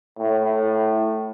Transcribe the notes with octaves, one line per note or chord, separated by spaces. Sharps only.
A2